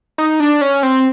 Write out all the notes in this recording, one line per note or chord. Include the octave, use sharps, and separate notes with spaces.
D#4
D4
C#4
C4